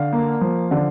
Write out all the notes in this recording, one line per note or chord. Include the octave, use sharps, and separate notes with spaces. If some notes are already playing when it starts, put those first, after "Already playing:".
Already playing: D3 F5
A#3
F3
D3